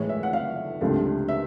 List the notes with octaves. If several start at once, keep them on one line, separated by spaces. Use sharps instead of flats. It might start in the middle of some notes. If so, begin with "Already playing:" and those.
Already playing: A2 E3 G#3 C#5
E5
F#5
F5
C#2 C3 F3 A3 D4
E5